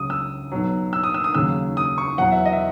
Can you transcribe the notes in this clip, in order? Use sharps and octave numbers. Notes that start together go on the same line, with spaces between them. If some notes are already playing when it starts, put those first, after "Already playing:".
Already playing: C#2 C#3 F#3 D#6
E6
B1 B2 F#3
E6
D#6
E6
D#6
D#2 C#3 F#3 E6
D#6
C#6
E2 B2 F#3 F#5
E5
D#5
E5